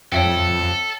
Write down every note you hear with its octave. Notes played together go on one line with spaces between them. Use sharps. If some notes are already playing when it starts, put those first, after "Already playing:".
F2 A4 C#5 E5 G5